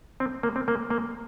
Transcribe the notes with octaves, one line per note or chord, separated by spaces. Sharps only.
C4
A#3
C4
A#3
A#3